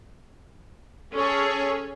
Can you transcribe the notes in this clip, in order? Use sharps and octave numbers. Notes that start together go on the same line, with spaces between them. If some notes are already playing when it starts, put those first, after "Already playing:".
C#4 G#4 A4 C#5